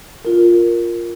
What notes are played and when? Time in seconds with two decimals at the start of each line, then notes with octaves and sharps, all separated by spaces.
0.25 F4 A#4